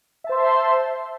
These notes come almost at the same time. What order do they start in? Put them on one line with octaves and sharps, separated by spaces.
E5 A5 C5 C6